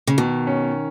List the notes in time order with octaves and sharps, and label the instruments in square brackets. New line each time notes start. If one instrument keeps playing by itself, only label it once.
[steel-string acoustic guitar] C#3
[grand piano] B2 [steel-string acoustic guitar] D#3
[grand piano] C#4